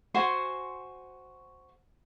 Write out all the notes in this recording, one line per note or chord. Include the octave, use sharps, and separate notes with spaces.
F#4 C5 G#5 C6